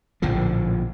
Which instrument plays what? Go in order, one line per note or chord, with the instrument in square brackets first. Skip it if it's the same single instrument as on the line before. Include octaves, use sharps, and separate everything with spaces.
[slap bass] A#1 A2 D3 F3